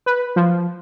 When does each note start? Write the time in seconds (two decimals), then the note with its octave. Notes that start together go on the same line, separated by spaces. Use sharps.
0.06 B4
0.36 F3